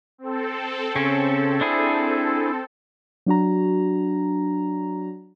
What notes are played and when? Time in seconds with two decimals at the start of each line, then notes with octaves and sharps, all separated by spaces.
0.18 C4 A4
0.96 C#3 C#4
1.61 D4 E4 G#4
3.26 F#3 D4 F#4 A#5